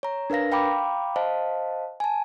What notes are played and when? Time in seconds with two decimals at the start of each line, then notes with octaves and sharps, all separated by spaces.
0.03 C#5 A#5
0.30 D4 A#4 B4 F5 A#6
0.52 F5 G5 A#5 B5 D6
1.16 C5 D#5 F5 A5
2.00 G#5 A5